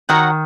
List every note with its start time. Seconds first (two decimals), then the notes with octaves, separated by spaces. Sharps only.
0.09 D#3 F#4 C#5 F#5 A#5